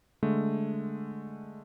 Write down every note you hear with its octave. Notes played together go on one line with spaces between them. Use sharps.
D3 G#3 A3